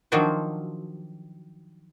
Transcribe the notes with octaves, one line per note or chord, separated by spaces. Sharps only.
D#3 F3 F#3 D4 F#4 C5